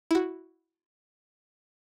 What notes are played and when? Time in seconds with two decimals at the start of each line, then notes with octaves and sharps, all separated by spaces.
0.11 E4 F#4